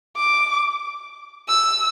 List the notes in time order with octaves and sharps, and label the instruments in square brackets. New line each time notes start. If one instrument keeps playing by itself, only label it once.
[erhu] D6
E6